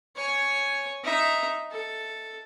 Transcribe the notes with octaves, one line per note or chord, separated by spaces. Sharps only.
C#5 G#5
D#4 E5
A4